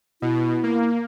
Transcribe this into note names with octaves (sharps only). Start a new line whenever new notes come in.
B2 E4
A#3